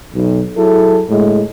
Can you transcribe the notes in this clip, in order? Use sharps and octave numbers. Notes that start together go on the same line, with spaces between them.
B1
F#3 E4 G#4 A4
D2 A2 G#3